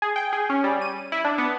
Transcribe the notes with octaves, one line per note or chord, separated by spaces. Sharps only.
G#4
G5
G#4
C#4
G3
D#7
E4
D4
B3